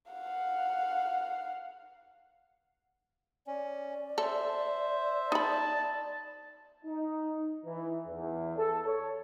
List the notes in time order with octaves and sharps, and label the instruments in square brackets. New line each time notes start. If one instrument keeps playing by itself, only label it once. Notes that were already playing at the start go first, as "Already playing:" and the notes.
[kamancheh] F5 F#5
[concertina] C#4 [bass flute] D5
[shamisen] A4 [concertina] C5 E5
[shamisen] D#4 B5 [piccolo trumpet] A5
[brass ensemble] D#4
E3
E2
A4
C#5